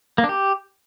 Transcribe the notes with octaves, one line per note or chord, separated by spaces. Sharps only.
A#3
D4
G4